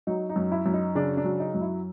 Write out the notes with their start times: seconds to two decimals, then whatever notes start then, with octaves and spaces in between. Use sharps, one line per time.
0.07 F#3 D#4
0.29 D#4
0.36 F#2
0.52 E4
0.66 F#2
0.74 D#4
0.95 C#3 D4
1.17 D4
1.24 F#3
1.40 D#4
1.55 F#2
1.61 E4